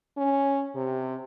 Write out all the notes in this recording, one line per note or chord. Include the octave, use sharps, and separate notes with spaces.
C#4
C3